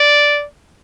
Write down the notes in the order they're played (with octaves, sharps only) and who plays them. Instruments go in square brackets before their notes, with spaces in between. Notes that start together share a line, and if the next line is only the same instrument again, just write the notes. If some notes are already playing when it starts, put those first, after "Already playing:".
Already playing: [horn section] D5